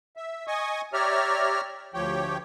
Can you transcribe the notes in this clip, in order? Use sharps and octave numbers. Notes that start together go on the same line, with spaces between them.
E5
D#5 G#5 C#6 D#6
G4 C#5 D5 E5 A#5 F6
D2 F3 G4 C#5 G5